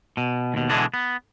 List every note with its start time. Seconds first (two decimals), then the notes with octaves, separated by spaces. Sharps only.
0.17 B2
0.54 D#2 B2
0.70 B2 D3 E3 G#3 D4
0.94 B3